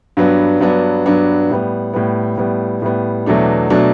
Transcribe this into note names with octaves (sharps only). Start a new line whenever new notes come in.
G2 F#3 B3 D4
G2 F#3 B3 D4
G2 F#3 B3 D4
A2 G3 B3
A2 G3 B3
A2 G3 B3
A2 G3 B3
E2 B2 F#3 A3 D4
B2 F#3 A3 D4